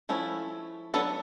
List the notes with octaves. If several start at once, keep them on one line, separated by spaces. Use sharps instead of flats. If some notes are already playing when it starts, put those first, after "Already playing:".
F3 A3 C#4 E4
F#3 B3 D4 A4 B4